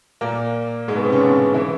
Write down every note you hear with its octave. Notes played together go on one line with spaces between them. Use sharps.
A#2 A#3
G#2 G#3
B2 B3
C3 C4
C#3 C#4
D3 D4
E3 E4